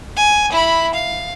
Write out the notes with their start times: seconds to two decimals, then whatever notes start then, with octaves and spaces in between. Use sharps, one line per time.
0.16 G#5
0.52 E4 B5
0.94 F5